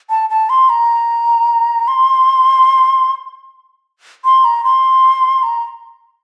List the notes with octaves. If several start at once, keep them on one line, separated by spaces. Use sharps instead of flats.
A5
A5
C6
A#5
C6
C6
A#5
C6
A#5